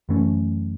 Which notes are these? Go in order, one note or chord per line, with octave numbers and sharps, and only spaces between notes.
F#2 E3 A3 C#4